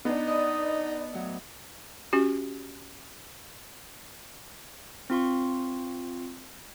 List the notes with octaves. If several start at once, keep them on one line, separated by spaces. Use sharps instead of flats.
B3 D4 D#4
D5 D#5
A2 F#3
C#4 F#4 G4
C4 F4 C6 C#6